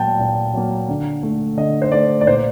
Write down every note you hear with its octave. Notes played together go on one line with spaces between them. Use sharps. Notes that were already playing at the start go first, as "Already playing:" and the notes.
Already playing: A#2 F#3 A#3 G5 A5
A#2
F#3 A#3
D3
A3
D3 D#5
C5
A3 D5
D5
A#2 C5